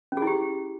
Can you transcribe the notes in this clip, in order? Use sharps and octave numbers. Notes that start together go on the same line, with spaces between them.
C#4
G#4
E4
G4